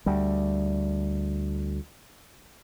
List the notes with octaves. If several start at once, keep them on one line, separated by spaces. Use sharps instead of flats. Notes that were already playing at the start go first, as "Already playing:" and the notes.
D2 G3